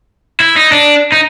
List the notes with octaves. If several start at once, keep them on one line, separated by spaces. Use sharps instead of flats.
E4
D#4
D4
D#4